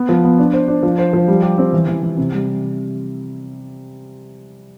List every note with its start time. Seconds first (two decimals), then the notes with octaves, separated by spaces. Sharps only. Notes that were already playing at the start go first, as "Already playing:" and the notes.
Already playing: B3
0.09 F3
0.24 B3
0.38 D4
0.53 C5
0.68 D4
0.83 F3
0.98 C5
1.13 F3
1.28 G3
1.43 G4
1.58 C4
1.73 E3
1.88 E3
2.03 E3
2.17 C3
2.33 G3